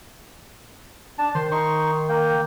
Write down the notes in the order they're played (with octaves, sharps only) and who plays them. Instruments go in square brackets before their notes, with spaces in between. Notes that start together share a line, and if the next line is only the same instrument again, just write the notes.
[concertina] D4 A5
[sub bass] D#3 [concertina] C5 C6
[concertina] D#4 C6 C#6
A#3 G5